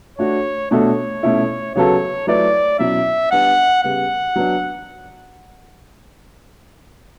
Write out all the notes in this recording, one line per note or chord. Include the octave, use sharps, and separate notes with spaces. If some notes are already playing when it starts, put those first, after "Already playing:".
A3 D4 F#4 C#5
B2 A3 D4 F#4 A4 C#5
B2 A3 C#4 E4
C#3 F#3 B3 F#4 A4 C#5
F#3 A3 E4 B4 D5
B2 F#3 C#4 E4 E5
G3 B3 D4 F#5
C#3 G3 B3 F#5
F#3 B3 D4